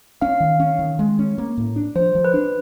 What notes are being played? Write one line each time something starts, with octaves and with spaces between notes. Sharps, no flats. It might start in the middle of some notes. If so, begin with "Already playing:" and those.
C#4 F5
D#3
C#4
D#3
G#3
C#4
A#3
A2
D4
F3 C5
F3
B4
D4